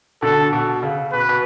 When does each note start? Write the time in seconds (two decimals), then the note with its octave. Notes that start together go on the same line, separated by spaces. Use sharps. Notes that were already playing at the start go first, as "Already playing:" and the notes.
0.22 B2 D3 A4
0.53 B2
0.83 C#3
1.12 B2 B4
1.29 B2